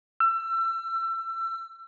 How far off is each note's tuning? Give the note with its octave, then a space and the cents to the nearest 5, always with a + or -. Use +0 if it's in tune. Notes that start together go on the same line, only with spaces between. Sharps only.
E6 +30